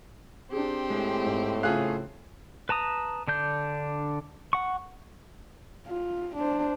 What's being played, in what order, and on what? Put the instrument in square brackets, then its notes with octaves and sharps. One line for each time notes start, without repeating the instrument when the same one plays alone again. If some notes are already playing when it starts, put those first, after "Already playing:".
[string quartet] C4 G4 C5 [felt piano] D4 G#4
[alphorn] A2 [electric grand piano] G#3
[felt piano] G#2
[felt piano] C#3 F4 F#6 [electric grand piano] A3 G#4 F5
[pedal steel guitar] B4 A5 A#5 D#6
D3 D4 G6
F#5 C#6
[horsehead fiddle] F4
D4 C5